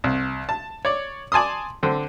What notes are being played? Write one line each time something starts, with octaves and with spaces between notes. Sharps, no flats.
C2
A5
C#5 D5
D5 G#5 A5 C6 D#6
D3 C4